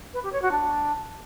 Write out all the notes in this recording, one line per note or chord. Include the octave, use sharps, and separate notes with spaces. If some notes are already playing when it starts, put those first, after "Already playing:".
B4
G4
C#5
F#4
D4